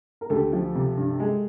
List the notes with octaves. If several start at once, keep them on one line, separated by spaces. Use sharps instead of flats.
A#4
D2 G4 A4
F3
C3
G2
G#3